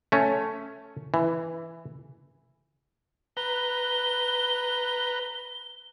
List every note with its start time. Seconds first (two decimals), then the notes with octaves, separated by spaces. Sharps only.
0.12 A3 C#4
1.14 E3
3.37 B4 A#5 G7